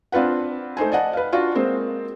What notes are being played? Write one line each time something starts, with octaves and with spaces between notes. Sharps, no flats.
C4 D4 F4 B4 F#5
A3 D#4 C5 G#5
D5 D#5 F#5 A5
B4 F5
D4 F4 F#4 D5
G#3 A#3 C4 C5